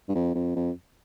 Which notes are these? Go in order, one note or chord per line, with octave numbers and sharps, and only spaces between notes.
G2
F2
F2
F2